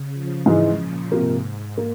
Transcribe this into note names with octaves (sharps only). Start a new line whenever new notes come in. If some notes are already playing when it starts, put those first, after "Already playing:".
Already playing: C#3
F3
G#2 C#3 E3 G#3
A#2
G#2 C3 F3 A#3
A#3